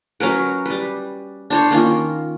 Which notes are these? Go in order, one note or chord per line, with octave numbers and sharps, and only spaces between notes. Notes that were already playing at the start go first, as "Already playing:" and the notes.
F#3 C#4 A#4 B4
G3 B4
D4 C5 C#5
D#3 A#3 C#4 F4